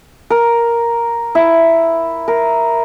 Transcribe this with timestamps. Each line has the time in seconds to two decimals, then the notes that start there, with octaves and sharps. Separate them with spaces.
0.30 A#4
1.35 E4
2.28 A#4